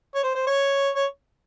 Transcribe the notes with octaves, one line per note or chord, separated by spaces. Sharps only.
C#5
C5
C5
C#5
C#5